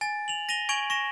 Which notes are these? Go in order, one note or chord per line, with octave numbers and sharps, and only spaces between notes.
G#5 A6
F7 F#7
A#6 D#7 F7 G7
G#5 C#6 G#6 D7 F7 F#7
C#6 A#6 E7